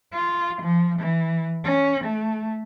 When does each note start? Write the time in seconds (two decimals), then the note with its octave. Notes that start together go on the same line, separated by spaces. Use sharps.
0.13 F4
0.62 F3
0.99 E3
1.64 C#4
2.04 A3